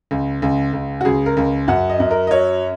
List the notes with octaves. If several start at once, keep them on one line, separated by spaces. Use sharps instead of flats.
C#2
C#2
C#2
F#4
C#2 G#4
A#4
C#2
F#2 F#5
D#5
F#2
A#4
D#5
F#3 C#5